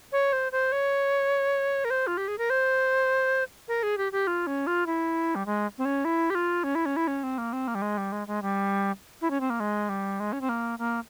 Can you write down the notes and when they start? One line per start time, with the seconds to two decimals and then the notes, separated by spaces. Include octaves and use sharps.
0.12 C#5
0.33 C5
0.52 C5
0.72 C#5
1.85 A#4
1.90 C5
2.07 F4
2.17 G4
2.28 G#4
2.38 A#4
2.50 C5
3.68 A#4
3.83 G#4
3.98 G4
4.12 G4
4.27 F4
4.47 C#4
4.67 F4
4.86 E4
5.35 G3
5.46 G#3
5.78 C4
5.85 C#4
6.05 E4
6.30 G4
6.35 F4
6.64 C#4
6.75 E4
6.86 C#4
6.96 E4
7.07 C#4
7.23 C4
7.38 A#3
7.53 C4
7.68 A#3
7.75 G3
7.82 G#3
7.97 G3
8.12 G#3
8.27 G#3
8.42 G3
9.21 E4
9.31 C#4
9.41 C4
9.50 A#3
9.60 G#3
9.89 G3
10.20 G#3
10.33 C#4
10.41 C4
10.49 A#3
10.79 A#3